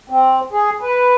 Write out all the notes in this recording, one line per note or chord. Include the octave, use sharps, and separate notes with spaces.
C4
G#4
B4